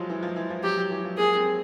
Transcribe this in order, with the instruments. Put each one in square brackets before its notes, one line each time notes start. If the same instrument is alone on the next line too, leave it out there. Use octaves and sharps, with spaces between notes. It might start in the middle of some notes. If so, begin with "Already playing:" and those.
Already playing: [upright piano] F3 F#3 G#3
E3
F3
E3
F3
[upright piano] F#3 [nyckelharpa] G4
[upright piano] F#3
E3
F3
[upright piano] A#3 [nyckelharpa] G#4
[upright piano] C4